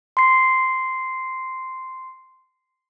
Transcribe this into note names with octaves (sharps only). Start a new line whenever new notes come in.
C6 C7